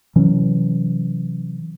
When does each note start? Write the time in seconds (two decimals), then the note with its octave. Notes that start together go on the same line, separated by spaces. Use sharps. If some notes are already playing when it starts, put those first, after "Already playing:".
0.16 C3 E3 F#3 C#4